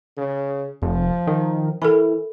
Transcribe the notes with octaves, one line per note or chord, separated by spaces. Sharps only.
C#3
F1 F3
D#3
E3 A4 A#4 B5